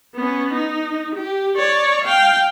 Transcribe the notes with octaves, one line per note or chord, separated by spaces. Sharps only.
B3 C#4
D#4
G4
C#5 D5
F5 G5